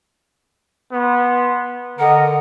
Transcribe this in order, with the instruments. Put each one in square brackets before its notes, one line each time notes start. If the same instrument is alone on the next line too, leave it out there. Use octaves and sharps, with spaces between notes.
[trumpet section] B3 C6
[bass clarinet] D3 [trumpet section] A#4 D#5 [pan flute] F#5